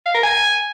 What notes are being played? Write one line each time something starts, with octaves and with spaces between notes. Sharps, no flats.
F5
A#4
G#5